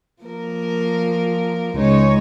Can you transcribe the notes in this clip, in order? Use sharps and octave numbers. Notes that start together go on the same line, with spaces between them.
F3 A#3 A#4
C#2 G#3 D#4 C#5